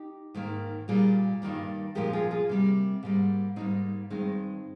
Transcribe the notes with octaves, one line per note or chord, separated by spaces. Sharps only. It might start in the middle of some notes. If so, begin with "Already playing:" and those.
Already playing: D#4 G4
G#2 D#3 A#3
A#2 G3 A#3 F4 G#4
G2 D#3 G3 A#3
A#2 F3 G#3 G4 A#4
F4 G#4
F4 G#4
C3 G3 A#3
G#2 G3 A#3
G#2 G3 A#3 C4 D#4
G2 D#3 G#3 C4 D#4